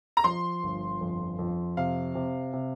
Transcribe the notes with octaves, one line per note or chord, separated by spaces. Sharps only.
A#5
F3 C6
G1
F2
F2
C3 F5
C3
C3